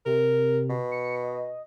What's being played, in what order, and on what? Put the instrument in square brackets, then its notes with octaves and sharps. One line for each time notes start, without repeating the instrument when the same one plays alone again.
[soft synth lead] C3 [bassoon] A#4
[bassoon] B2
[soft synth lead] C#7
D#5